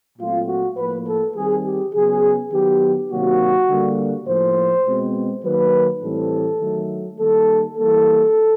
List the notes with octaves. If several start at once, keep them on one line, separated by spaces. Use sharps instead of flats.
A#2 F#3 A3 C4 F4
F#4
A2 F3 A#3 B4
A4
D#3 G3 C4 G#4
G4
C#3 F#3 B3 G#4
D#3 F#3 B3 G4
C3 D#3 F#3 A#3 F#4
D3 G3 A#3
A2 F3 A#3 C5
B2 G#3 C4
D#3 F#3 A#3 B4
A2 E3 G3 C4 A4
D#3 F#3 A3
D#3 G3 A#3 A4
E3 G3 A#3 A4